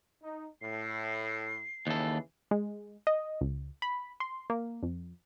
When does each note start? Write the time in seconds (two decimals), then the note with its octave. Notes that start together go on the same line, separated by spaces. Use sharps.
0.23 D#4
0.61 A2 C7
1.87 D#2 C#3 E3 A4
2.51 G#3
3.07 D#5
3.41 C#2
3.82 B5
4.20 C6
4.50 A#3
4.83 F2